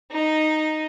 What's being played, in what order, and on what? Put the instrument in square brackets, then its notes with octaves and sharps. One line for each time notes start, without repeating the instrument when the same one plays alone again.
[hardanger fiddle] D#4